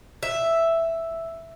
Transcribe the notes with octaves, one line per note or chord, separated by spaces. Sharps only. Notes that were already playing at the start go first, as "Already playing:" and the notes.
E5